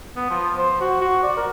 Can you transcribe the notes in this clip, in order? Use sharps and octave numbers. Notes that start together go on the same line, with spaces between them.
B3
F3
C5
F#4
F#4
D5
A#4